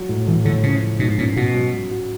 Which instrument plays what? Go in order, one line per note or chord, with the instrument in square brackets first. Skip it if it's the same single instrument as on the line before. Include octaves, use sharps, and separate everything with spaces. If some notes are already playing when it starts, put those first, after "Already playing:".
Already playing: [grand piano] F#3
A2
[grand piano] A2 [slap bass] E3
[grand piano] A2 [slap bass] D3
[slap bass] C#3 [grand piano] F3
[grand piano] F3
[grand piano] G#2 [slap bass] B2
[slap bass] A#2 [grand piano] C#4
[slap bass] B2 [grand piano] F#4
[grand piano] F#3
F#3
F#4